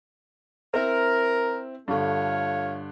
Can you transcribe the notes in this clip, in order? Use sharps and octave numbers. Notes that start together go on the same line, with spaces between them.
C4 E4 A#4
G2 D3 A3 F4 C#5